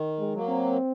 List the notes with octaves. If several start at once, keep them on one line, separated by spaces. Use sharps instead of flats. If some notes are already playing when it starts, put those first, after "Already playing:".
Already playing: D#3
G#3
F#3 A#3
C4